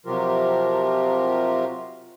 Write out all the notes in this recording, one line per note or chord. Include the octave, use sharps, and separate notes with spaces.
C3 F3 F#3 F4 G4 A#4